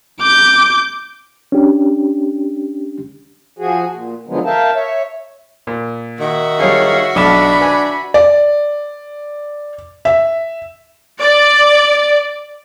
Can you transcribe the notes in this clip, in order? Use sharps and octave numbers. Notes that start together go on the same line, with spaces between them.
D6 G6
C#4 D4 G4
F3 F#4 G#4
A#2
D3 D#3 F3 F#3 G#3 B3
A#4 E5 F5 G5 A5
C#5 E5
A#2
D#3 F#4 E5
G3 G#4 C#5 F5
B1 D4 A5 B5 F6
B4 G#5
D5
E5
D5